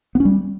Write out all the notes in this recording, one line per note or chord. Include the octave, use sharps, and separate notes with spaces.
B3
C#4
G3